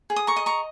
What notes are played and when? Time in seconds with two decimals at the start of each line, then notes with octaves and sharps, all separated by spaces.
0.10 G#4
0.16 D#6
0.27 A#5 C#6
0.36 D#5
0.46 A#5 C#6